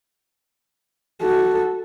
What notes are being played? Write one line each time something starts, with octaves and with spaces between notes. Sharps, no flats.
F#4 A4